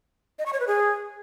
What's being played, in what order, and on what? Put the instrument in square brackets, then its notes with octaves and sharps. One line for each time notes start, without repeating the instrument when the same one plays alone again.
[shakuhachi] D#5
C#6
C#5
B4
G#4